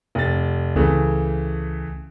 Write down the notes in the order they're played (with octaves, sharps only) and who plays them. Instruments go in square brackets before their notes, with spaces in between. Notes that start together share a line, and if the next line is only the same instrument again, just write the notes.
[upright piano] F1 A6
[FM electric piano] C#2 [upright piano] C#3 E3 A3